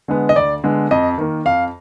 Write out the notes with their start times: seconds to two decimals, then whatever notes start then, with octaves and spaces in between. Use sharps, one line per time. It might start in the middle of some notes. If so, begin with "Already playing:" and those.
0.08 D3 G#3 B3
0.29 D#5
0.35 D2 D5
0.64 D3 G#3 B3
0.91 F2 D#5
1.18 D#3 A#3
1.45 F2 F5